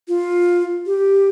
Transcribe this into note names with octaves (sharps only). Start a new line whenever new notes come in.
F4
G4